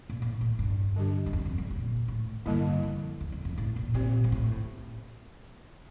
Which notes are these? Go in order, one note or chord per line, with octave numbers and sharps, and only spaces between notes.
A#2
A#2
A2
G2
D3 G3 D4 G4
G2
F2
F2
G2
A#2
A2
G2 D3 G3 A#3 E4
F2
E2
F2
F2
A2
A#2
A#2 C4 G4 C5
G2
A2